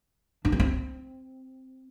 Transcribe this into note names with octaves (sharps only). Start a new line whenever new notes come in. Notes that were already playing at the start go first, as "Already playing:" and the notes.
D4
C#4
C4